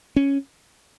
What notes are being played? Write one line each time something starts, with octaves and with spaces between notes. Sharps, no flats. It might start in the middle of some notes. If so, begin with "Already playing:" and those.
C#4